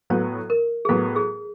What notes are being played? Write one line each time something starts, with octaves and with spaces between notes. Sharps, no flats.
A2 F#3 B3 C#5
A#4
G#4
A2 F#3 B3 A4
G#4